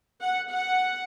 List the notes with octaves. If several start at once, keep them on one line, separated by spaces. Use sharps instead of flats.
F#5
F#5